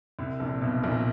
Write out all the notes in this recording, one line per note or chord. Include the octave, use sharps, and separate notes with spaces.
C2 C3
A#1 A#2
B1 B2
A#1 A#2